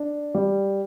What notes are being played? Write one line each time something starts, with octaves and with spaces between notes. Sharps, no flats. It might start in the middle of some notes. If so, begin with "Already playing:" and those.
Already playing: D4
G3